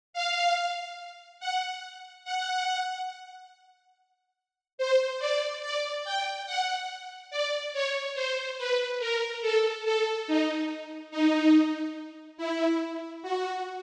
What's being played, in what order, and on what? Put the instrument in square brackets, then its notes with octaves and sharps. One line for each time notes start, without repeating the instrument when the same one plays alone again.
[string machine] F5
F#5
F#5
C5
D5
D5
G5
F#5
D5
C#5
C5
B4
A#4
A4
A4
D#4
D#4
E4
F#4